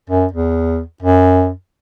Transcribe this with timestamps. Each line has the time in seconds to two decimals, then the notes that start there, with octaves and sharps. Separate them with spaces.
0.09 F#2
0.32 E2
1.02 F#2